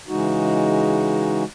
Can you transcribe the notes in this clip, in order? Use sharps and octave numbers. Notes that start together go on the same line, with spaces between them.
C#3 E3 G#3 D#4 F#4